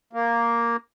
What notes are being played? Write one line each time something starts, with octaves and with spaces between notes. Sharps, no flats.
A#3